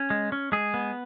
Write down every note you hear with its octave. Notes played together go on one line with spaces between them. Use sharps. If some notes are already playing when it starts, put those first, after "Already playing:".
Already playing: C#4
G#3
C#4
G#3 G#4
B3